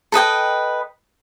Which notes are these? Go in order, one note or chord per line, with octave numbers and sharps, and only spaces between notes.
A4 B4 D#5 G5